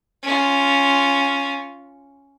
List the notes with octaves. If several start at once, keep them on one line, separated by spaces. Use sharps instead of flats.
C#4 F4